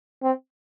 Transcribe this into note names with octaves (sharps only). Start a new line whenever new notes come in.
C4